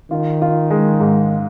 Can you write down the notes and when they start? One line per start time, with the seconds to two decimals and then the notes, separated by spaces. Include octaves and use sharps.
0.11 D#3 F4
0.42 F4
0.71 G#3
1.00 G#2